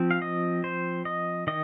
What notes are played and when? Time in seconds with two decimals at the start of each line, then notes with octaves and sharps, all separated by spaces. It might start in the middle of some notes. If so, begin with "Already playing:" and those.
Already playing: F3 C4
0.11 F5
0.22 D#5
0.64 C5
1.05 D#5
1.47 D#3 D#5